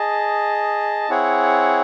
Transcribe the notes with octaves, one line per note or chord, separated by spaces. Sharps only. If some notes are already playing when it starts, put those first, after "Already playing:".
Already playing: G#4 D#5 A5
C4 E4 G#4 C#5 F#5